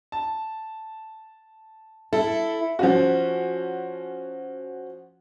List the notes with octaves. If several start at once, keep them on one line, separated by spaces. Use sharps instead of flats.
A5
E4 A4
F3 C#4 F#4